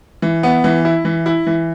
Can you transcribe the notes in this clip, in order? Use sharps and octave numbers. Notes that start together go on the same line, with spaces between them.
E3
B3
E3
E4
E3
E4
E3